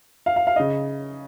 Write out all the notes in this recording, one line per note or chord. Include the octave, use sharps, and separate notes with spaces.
F5
F5
F5
C#3 D#5